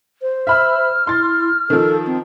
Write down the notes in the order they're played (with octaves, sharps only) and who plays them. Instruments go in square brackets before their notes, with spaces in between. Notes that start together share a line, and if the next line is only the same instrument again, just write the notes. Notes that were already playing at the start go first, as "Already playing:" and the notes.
[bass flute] C5
[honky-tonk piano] E5 B5 E6 [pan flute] F6
[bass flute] E4 [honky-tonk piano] C6 A6
[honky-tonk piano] D#3 F3 [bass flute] A4
[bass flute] C4